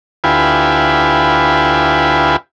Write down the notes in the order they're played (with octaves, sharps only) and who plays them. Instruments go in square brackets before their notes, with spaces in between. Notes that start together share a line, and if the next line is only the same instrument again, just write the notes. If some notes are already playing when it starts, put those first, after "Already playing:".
[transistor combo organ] D2 E4 F4 G4 B4 G#5